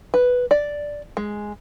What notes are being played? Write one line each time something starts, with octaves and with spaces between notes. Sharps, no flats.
B4
D5
G#3